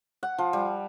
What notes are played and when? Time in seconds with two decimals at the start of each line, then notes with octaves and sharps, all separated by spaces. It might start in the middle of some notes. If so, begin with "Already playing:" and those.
0.23 F#5
0.38 F3
0.53 G3